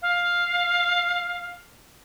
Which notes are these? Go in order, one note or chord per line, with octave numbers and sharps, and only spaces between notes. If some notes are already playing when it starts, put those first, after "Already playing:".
F5